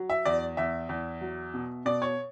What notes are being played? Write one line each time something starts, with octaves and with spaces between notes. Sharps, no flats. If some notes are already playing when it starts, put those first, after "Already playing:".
Already playing: F#3
E5
E2 D5
E2 E5
E2
F#3
B2
B2 D5
C#5